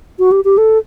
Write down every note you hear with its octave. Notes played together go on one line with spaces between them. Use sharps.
F#4
G4
G4
A4